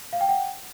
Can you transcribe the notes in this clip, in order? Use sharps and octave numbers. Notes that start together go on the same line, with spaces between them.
F5
G5
F#5